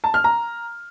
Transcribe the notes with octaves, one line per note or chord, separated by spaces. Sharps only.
A5
F6
A#5